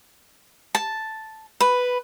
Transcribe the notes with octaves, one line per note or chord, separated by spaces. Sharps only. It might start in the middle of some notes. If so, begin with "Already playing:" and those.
A5
B4